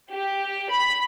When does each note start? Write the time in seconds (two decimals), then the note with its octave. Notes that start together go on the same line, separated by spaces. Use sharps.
0.11 G4
0.71 B5